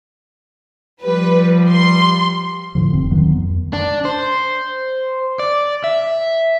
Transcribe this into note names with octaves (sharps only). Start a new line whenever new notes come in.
F3 G3 B4
C6
A2 D3 F3
F1 F3 C4
D2 D#3 F#3 B3
F2
D4
C5
D5
E5